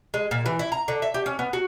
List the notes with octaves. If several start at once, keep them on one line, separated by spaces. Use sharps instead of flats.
G#3
A#2
E3
E4
A#5
D3
E5
G4
C#4
B3
F#4